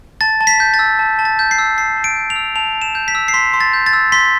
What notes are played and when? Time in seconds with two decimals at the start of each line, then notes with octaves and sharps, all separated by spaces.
0.21 A5 A6
0.41 A5
0.47 B6
0.60 G6
0.74 A6
0.79 E6
0.99 A5
1.19 A5
1.25 A6
1.39 G6
1.51 C7
1.58 E6
1.77 A5 C7
1.97 A5
2.04 D7
2.16 G6
2.30 F7
2.36 E6
2.56 A5 F7
2.75 A5
2.82 E7
2.95 G6
3.08 B6
3.15 E6
3.28 C7
3.34 C6 B6
3.54 C6
3.60 A6
3.73 G6
3.86 A6
3.93 E6
4.12 C6 B6